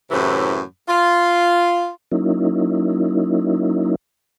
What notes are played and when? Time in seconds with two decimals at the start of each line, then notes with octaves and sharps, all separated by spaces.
0.11 F#2 A2 C3 E3
0.87 F4
2.12 F#3 A#3 C#4 D#4 E4